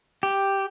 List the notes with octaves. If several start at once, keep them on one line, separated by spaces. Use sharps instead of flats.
G4